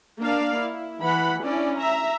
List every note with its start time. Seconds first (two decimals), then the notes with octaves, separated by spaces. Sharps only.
0.20 A#3 D4 D5 F5
0.58 E4
1.00 E3 F#5 B5
1.44 C#4 D4 E4 D5
1.77 E5 A#5